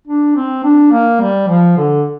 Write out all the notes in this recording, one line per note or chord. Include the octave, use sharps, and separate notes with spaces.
D4
C4
D4
A#3
G3
F3
D3